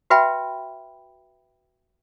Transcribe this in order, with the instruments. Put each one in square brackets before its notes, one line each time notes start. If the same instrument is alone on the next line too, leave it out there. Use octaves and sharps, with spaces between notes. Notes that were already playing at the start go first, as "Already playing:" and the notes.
[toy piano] F#4 B4 E5 G5 B5